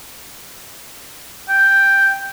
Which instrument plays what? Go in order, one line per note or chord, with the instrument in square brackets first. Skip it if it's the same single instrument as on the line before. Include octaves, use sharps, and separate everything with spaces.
[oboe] G5